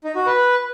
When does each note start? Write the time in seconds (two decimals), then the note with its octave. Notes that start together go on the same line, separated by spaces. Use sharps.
0.04 D#4
0.15 F#4
0.26 B4